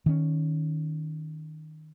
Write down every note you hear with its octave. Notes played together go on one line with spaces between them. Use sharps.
D#3 C#4